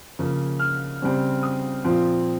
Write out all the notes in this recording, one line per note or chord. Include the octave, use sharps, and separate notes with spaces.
C#3 F3 A#3
F6
C#3 G3 C4
D#6
A#2 F3 C4 F4